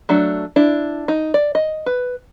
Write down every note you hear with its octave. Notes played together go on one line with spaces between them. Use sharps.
F#3 A3 D4
D4 E4
D#4
D5
D#5
B4